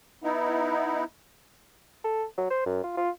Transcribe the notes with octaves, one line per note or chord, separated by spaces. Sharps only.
B3 D#4 E4
A4
F#3
C5
F#2
F4
F4